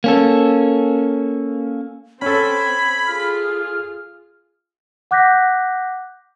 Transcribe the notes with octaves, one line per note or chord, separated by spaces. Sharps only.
A#3 C#4 A4
C4 C#4 A4 B5 G#6
F4 G#4 F6
F#5 D6 F#6 G6 A#6 B6